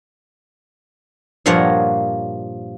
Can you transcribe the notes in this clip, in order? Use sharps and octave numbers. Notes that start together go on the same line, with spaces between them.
G2 A#2 F3 A#4 C#5 F#5